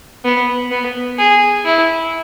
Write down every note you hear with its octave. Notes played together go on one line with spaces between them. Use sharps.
B3
B3
G#4
E4